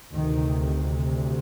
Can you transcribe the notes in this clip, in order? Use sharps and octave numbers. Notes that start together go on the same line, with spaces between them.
D2 C3 D#3